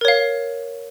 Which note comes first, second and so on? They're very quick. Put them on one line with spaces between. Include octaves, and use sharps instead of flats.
A#4 C#5 F5